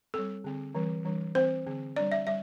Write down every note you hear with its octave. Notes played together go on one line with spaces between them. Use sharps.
G3 C4 A4
D3 C4
E3 G3 C4
E3 G3 D4
E3 C4 C5
D3 C4
G3 D4 D5
E5
G3 E5